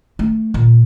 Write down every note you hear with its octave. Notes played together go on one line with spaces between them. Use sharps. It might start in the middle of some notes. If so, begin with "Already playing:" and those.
A3
A#2